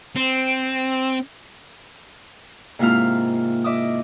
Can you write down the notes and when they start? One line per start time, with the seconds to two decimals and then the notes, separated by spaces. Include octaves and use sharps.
0.16 C4
2.79 G#2 C3 A#3 E4 F4 F6
3.64 D#5 E5 D6 D#6